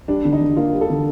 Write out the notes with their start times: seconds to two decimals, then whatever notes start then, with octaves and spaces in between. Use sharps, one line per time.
0.08 G3 D4
0.25 D3
0.32 D#4
0.41 D3
0.57 A#3 F4
0.73 G3
0.81 A4
0.90 D3